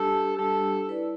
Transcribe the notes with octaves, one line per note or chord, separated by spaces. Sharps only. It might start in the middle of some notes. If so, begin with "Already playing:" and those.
Already playing: G3 D4 G4 A4
G3 D4 G4 A4
E4 B4 D5